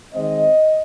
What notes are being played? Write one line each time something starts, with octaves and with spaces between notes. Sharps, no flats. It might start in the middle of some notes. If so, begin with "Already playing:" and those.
D#3 G#3 C4 D#5